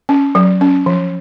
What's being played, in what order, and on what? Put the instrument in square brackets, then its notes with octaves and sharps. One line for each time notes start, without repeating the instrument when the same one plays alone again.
[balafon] C#4
F#3
C#4
F3